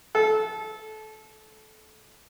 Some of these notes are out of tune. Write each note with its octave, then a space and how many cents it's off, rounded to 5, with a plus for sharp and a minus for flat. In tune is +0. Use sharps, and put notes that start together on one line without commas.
A4 -25